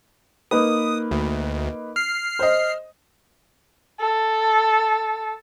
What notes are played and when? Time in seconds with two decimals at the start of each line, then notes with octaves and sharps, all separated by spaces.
0.51 A#3 D#4 B4 D#6
1.11 D2
1.96 F6 C7
2.39 C5 D#5
4.00 A4